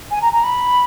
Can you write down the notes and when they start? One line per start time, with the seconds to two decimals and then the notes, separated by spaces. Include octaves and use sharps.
0.11 G#5
0.22 A#5
0.33 A#5
0.44 B5